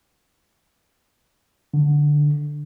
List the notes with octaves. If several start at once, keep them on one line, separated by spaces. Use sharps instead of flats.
D3